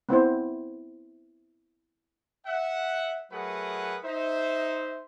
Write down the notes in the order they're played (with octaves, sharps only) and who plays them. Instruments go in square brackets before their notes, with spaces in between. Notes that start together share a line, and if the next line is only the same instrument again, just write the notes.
[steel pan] B3 C4 E4 C5
[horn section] E5 F#5
F#3 A3 G#4 A#4 B4 F#5
D#4 C5 E5